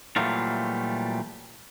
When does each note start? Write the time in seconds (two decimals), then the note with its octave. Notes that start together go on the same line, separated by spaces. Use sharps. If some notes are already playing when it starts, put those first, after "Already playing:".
0.16 A#2 E3 F#3 G3 A3 F4